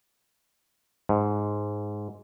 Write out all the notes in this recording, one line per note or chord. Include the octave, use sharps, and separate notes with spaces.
G#2